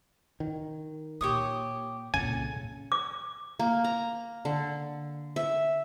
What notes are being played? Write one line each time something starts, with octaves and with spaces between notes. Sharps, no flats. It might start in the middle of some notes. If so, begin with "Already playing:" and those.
D#3
A#2 G4 C#5 D#6
C2 A#2 C#3 A4 G#5
D6
A#3
A#5
D3
E5